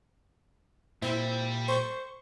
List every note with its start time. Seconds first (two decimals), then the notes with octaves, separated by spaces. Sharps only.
1.02 A#2 G3 C4 E4
1.68 C5 C#6